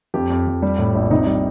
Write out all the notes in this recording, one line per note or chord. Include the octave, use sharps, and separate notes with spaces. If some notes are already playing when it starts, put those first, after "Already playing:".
F2 G4
F2
F2
G3
A2
A#1
C3 D#4
G3